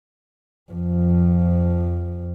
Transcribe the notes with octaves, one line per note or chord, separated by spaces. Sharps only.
F2 F3